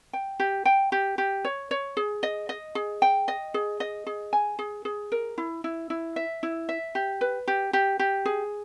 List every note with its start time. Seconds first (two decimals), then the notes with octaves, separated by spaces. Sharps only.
0.13 G5
0.40 G4
0.65 G5
0.92 G4
1.18 G4
1.45 C#5
1.71 C#5
1.97 G#4
2.23 D#5
2.49 D#5
2.75 G#4
3.02 G5
3.28 D#5
3.54 G#4
3.80 D#5
4.07 G#4
4.33 G#5
4.59 G#4
4.85 G#4
5.12 A#4
5.38 E4
5.64 E4
5.90 E4
6.16 E5
6.43 E4
6.69 E5
6.95 G4
7.21 B4
7.48 G4
7.73 G4
7.99 G4
8.26 G#4